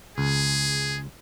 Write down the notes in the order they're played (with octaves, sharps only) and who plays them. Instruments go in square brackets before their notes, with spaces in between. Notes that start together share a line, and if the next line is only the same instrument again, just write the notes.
[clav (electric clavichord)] C#2 [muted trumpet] G#4